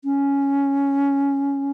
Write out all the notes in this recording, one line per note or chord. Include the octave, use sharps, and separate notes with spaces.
C#4